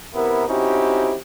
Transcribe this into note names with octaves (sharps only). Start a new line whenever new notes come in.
C3 B3 E4 A#4
C4 C#4 D#4 E4 F#4 G4